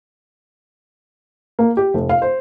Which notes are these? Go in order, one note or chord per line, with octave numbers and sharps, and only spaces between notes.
A#3
G4
F1
F5
C5